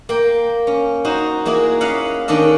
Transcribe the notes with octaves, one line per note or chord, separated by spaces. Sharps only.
A#3 G5
C#4
D#4 F#4 C5
G#3 A#3 E4 F#4 G#4
C#4 D#5 F5 F#5 B5
D#3 C#4 D4 A4 D#5